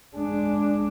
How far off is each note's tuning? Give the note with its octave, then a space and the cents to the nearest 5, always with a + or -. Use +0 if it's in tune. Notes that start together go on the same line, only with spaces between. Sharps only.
G#3 +0 D4 +0